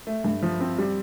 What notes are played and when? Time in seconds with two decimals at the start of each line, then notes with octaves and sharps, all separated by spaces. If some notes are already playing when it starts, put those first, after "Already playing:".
0.07 A3
0.24 G2
0.42 F3
0.61 C4
0.78 G3